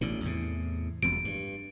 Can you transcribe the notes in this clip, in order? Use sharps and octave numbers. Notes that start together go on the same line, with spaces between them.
A1 B2 D3
E2 A2 C3
E1 F2 B2 D7
G2